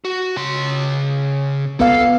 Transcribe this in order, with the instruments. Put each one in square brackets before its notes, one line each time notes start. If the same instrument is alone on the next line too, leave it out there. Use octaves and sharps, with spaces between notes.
[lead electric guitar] F#4
C#3 C6
[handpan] B3 F5 [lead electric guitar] A4